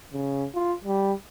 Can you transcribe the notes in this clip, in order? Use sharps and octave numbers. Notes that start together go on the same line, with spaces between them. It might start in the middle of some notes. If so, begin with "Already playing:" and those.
C#3
F4
G3